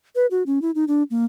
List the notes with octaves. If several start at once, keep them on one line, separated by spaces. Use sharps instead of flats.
B4
F#4
C#4
E4
D#4
D4
A#3